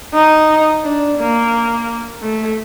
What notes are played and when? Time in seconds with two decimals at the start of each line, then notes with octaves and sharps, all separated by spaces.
0.14 D#4
0.83 D4
1.18 A#3
2.22 A3